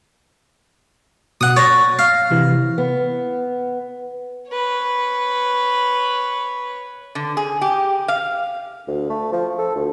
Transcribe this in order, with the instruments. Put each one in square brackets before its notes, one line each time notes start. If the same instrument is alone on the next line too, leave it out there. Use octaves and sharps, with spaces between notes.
[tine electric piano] B2 [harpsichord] F#5 D#6
[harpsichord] C#5 [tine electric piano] A6 A#6
[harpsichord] F5
[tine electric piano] C3 E3 E4
[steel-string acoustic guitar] B3
[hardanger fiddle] B4 C#5
[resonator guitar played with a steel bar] D3
G#4
G4
F5
[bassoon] D2
A3
F3
A4
D2